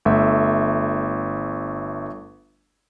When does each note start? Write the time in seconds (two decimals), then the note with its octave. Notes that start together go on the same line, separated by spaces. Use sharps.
0.05 G1 A3 E5